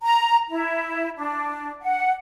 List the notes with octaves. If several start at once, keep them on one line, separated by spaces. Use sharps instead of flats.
A#5
E4
D4
F#5